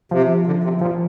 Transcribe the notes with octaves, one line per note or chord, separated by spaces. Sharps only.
C3 F3
D3
C3
A#2 F3